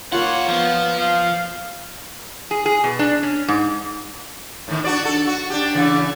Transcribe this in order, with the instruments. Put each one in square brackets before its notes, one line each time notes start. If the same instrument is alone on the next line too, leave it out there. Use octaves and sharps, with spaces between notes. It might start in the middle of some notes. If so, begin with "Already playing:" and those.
[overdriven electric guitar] A#2 F#5 [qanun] A#3 F4 [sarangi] C#5
[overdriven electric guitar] F3 [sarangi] B3
[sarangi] F5
[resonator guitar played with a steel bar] G#4
G#4
B2
D4
C#4
G#2
[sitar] A2 D#3
D4 F#4 D5
A4
F#4
D4 G4
C#3 E3